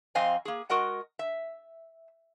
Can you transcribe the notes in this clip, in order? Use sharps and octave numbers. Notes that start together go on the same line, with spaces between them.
F2 C4 D#5 F5 G#5
A#3 G#4
G#3 F#4 A#4 D#5 F#5
E5